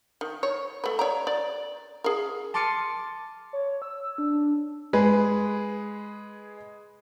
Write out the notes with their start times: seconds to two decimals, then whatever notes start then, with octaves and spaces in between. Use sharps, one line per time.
0.21 D#3
0.43 C#5
0.84 A3 B4
0.99 C#5 D5 A#5
1.27 D5
2.04 G#4 A#4
2.54 A5 C6 D6 F6 C#7 D#7
3.53 C#5
3.82 E6
4.18 D4
4.93 G#3 G#4 B4